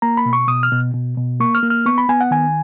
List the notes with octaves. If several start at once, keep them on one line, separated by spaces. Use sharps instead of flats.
A#3 A#5
B5
B2
C#6
B2 D#6
F6
B2
B2
B2
A#3 C#6
F6
A#3
F6
B3 C#6
B5
B3 G#5
F#5
D#3 G#5